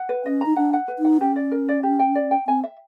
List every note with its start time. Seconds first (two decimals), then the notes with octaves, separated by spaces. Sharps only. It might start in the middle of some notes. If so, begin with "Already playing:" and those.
Already playing: F#5
0.09 B4
0.25 C#4 D#5
0.41 D#4 A#5
0.56 D4 F#5
0.73 F#5
0.88 B4
0.99 D#4
1.05 F#5
1.21 C#4 G4
1.36 D5
1.51 A#4
1.69 D5
1.83 G4
1.99 G5
2.15 D5
2.31 G5
2.47 C4 G#5
2.63 E5